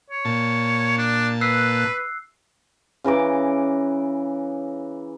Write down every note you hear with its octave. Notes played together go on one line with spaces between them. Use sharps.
C#5
A#2 A5
D4
B4 E6 F#6 C7
C#3 E3 A#5 D6